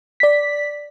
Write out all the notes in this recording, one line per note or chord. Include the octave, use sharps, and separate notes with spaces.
D5 B6